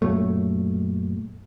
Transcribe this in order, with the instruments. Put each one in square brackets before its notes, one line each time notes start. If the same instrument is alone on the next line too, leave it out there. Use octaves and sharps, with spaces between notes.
[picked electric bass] F#2 A#2 F#3 A3